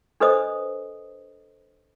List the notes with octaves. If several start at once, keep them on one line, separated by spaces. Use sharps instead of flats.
D4 A4 B4 C5 D#5 D#6